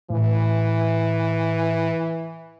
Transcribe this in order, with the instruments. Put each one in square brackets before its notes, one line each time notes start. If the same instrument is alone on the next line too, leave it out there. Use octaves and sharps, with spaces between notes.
[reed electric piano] A2 [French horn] E3